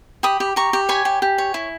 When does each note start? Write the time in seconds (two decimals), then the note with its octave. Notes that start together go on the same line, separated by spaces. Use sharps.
0.23 G4 B5 D#6
0.40 G4
0.56 G4 A#5 C#6
0.73 G4
0.89 C#5 G#5 B5
1.05 G4
1.22 G4
1.38 C#5
1.54 E4